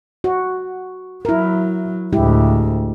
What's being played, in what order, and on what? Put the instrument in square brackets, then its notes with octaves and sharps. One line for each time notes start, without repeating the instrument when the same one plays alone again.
[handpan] F#4
[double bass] F#3 [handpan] E4 A#4
[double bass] D2 A2 [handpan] G#3 E4 G4